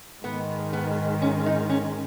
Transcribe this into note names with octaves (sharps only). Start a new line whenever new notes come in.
G#2 D#3 G#3 B3
B3
C#4
D#4
C#4